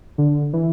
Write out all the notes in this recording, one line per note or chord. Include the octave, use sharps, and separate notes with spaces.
D3
E3